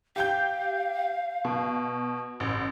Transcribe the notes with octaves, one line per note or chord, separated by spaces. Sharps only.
G4 F5 G5 G6
B2
A1